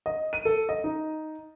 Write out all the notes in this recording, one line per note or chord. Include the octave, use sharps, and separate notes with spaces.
D#5
D#7
A4
D#5
D#4